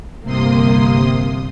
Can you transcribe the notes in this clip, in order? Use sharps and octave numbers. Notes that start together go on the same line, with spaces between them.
G1 C2 C3 A#3 C6 D#6